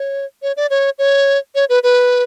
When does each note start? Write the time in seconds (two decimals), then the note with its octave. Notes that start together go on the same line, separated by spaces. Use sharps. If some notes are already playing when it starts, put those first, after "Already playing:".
Already playing: C#5
0.42 C#5
0.57 D5
0.70 C#5
0.99 C#5
1.55 C#5
1.69 B4
1.83 B4